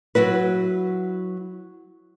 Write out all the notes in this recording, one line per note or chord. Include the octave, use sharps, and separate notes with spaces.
F#3 E4 F#4 B4